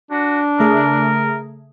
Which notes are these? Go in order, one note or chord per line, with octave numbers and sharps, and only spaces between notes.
D4 F#4
C#3 A3 G#4 A#4